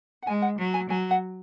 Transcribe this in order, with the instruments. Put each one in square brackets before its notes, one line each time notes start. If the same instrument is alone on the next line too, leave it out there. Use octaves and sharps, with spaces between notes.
[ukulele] F#5
[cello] G#3 [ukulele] G#5
[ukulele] F#5
[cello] F#3
[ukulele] G#5
[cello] F#3 [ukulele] G#5
[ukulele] F#5